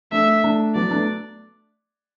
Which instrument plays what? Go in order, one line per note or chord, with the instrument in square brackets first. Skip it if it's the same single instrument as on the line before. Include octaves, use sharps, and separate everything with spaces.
[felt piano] A3 D4 [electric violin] E5
[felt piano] A3 D4
[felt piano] F#3 B3 [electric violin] D5
[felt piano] A3 D4